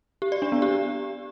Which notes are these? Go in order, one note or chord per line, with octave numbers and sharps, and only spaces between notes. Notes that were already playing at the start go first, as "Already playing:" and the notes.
G4
D5
D4
B3
G4